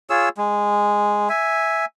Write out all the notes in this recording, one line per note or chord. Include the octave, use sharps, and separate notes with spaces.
F4 G#4 C#5 E6
G#3
E5 G#5